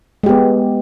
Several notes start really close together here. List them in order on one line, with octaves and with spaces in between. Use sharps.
G#3 G4 B3